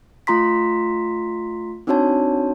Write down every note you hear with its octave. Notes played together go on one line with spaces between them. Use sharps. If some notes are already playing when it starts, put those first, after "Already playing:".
A3 F4 A#5 C6 B6
C4 D4 D#4 F#4 C#5 A5